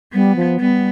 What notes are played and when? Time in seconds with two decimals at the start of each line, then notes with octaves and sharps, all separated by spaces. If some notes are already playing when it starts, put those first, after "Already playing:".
0.13 G3 B3
0.36 F3
0.60 G3 B3